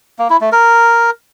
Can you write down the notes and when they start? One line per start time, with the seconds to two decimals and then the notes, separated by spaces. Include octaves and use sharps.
0.19 A#3
0.30 E4
0.41 A3
0.52 A#4